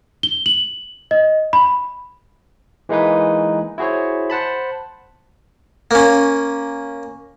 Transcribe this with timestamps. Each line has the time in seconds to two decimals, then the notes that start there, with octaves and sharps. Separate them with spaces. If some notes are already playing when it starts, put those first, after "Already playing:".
0.23 G7
0.46 F#7
1.11 D#5
1.53 B5
2.89 E3 G#3 A#3 D#4 G#4 B4
3.78 E4 F#4 G#4 C5 C#5
4.30 C5 F#5 A5 B5
5.91 A#3 C#4